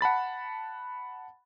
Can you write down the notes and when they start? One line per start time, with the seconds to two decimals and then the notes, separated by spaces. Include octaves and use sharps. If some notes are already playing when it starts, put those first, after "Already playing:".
0.01 F#5 A5 B5 A6